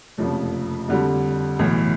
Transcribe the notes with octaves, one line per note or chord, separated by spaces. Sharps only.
F#1 F2 C3 F3 A3
F2 D3 G3
B1 A2 E3